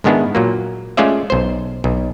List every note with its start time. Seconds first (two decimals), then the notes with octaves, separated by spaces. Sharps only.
0.04 G#2 D#3 G#3 B3 D4 E4
0.35 A#2 F#3 A#3
0.97 G#3 A3 C#4 F4 D5 E5
1.30 B1 C5
1.84 B1